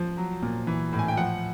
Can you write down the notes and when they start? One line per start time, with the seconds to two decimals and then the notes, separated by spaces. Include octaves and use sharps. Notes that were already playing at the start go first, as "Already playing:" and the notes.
Already playing: F3
0.17 F#3
0.42 A#2
0.67 E3
0.93 A2
0.99 G#5
1.08 G5
1.17 F3 F#5